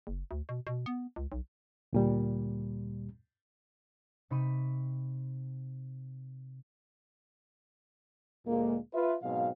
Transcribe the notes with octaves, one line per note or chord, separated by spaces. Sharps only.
F#1
D2
B2
B2
B3
C#2
B1
D2 A#2 G3
C3 D#4 B5 C#6 D#7
D2 A#2 G#3 A#3
F4 B4 E5
G#2 B2 F#3 C4 F5